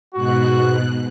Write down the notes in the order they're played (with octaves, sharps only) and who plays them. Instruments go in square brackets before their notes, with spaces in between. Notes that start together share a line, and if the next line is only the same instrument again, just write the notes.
[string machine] G#2 B2 F#6 [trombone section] F#4